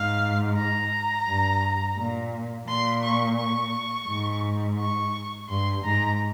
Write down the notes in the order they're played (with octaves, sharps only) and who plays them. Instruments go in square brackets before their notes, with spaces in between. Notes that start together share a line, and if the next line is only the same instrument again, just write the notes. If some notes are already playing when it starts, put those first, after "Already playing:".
Already playing: [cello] G#2 [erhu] F5
[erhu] A#5
[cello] G2
A#2
[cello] A#2 [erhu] C6
[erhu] C#6
C#6
[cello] G#2
[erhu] C#6
[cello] G2 [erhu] C6
[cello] G#2 [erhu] A#5